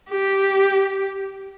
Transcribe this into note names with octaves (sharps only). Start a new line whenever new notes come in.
G4